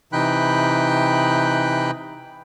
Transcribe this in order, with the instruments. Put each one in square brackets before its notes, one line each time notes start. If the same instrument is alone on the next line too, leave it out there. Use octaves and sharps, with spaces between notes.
[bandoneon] C3 E3 D#4 G5 B5 F#6